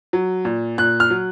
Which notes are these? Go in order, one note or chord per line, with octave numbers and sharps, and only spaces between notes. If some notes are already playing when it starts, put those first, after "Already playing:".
F#3
A#2
A#2 F#6
F6
F#3